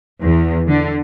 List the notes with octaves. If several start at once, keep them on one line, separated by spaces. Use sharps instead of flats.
E2
D3